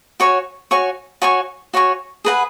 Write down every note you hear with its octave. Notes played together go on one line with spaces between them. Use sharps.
F#4 C#5 G#5 C#6
F#4 C#5 G#5 C#6
F#4 C#5 G#5 C#6
F#4 C#5 G#5 C#6
G#4 B4 F#5